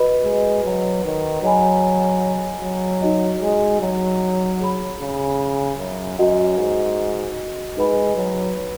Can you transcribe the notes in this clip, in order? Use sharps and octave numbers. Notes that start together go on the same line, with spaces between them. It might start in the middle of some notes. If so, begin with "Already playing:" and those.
Already playing: F#4 B4 D#5 B5
G#3
F#3
D#3
F#3 G#4 D#5 G#5 B5
F#3
D#4 F#4 D#5
G#3
F#3
G#4 C#5 B5
C#3
F#2
F#2 F#4 D#5 F#5
G#2
G#3 D#4 B4 F#5 B5
F#3